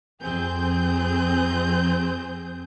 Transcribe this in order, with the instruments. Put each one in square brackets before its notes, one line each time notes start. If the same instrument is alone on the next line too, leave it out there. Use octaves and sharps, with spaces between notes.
[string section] F2 C4 G#4 G6